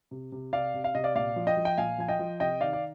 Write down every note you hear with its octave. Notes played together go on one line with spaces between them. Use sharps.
C3
C3
C3 D5 F5
C3
F5
C3 D#5
D5 F5
A#2 D5 F5
F3
D#5 G5
F3
G5
A#2 F5 G#5
F3 G#5
D#5 G5
F3
C3 D#5 G5
D#3 D5 F5
D5